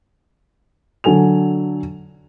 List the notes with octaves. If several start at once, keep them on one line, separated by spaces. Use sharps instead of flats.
D3 F#3 A4 G#5 F7